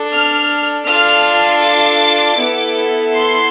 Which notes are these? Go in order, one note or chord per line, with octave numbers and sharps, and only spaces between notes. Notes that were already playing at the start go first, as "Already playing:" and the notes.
Already playing: D4 A4
F6
D4 F4 A4 F6
D6
B3 E4 A4
C6